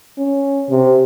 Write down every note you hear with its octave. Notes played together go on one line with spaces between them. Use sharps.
C#4
C3